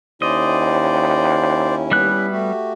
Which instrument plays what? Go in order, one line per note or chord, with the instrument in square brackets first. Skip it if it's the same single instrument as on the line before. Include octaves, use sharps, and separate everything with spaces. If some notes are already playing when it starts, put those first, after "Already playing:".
[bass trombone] D#2 [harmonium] C#4 E4 [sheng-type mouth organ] C5 D5 [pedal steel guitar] D#5
[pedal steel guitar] G3 E5 F#6 [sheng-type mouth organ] B3
[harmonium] A3 F#4 G4